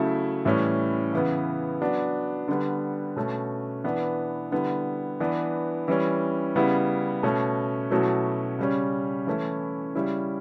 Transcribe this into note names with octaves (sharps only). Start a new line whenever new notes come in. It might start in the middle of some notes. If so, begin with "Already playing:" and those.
Already playing: C#3 F#3 A3 E4
A2 E3 G3 C#4 E4
C#3 E3 B3
F#3 B3 D4
D3 G3 B3
B2 A3 C#4
E3 B3 D4
D3 G3 B3 E4
E3 B3 D4
E3 G3 C#4
C#3 G3 B3 E4
B2 A3 C#4
B2 F#3 A3 C#4 E4
C#3 G3 C#4
E3 A3 C#4 E4
C#3 G3 C#4 E4